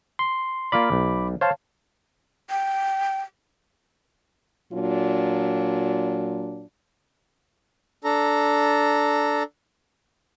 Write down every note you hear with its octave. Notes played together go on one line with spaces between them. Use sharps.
C6
A#3 F4 D5 B5 D6
B1
C5 C#5 F5 A5
G5
A#2 F#3 D4 F4
D4 A4 A#5